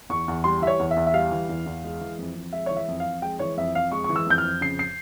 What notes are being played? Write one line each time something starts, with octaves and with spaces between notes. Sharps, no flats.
E2 C#6
E2
G3 C6
E3 E5
C#5
E2
E5
E2
E5
G3 F5
E3
E2
E2
G#3
E3
F2
F2
G#3 E5
E3 C#5
E5
F2
F5
F2
G#3 G5
E3 C#5
F2 E5
F2 F5
G#3 C#6
E3 C#6
E6
F2 G6
F6
F2
C#3 C7
C7